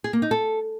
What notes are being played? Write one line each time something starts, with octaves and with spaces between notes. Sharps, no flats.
G#4
A#3
D#4
A4